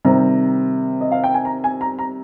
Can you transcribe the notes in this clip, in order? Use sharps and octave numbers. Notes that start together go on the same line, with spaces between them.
C3 D#3 G3 C4 A#5
D#5
F5
G5
G#5
A#5
G#5
A#5
A#5